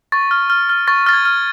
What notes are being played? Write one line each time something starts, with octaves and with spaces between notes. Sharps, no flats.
C#6 A6
F6
F6
F6
C#6 A6
F6 A6
G#6
F6